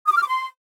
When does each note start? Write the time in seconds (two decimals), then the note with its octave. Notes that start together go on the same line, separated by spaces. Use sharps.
0.06 D#6
0.12 D6
0.17 F6
0.22 D6
0.28 C6